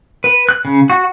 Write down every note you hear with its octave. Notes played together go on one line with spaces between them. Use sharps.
B4
F#6
C#3
F#4